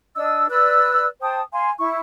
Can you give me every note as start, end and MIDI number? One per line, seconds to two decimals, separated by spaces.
0.15 0.47 62
0.15 0.47 75
0.15 0.47 88
0.49 1.06 71
0.49 1.06 74
0.49 1.06 88
0.49 1.06 90
1.22 1.41 72
1.22 1.41 79
1.22 1.41 81
1.22 1.41 87
1.52 1.71 77
1.52 1.71 80
1.52 1.71 84
1.80 2.01 64
1.80 2.01 85